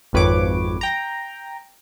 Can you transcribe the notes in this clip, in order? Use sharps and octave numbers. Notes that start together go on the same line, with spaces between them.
G#1 F2 B4 C#5 D6
G5 A#5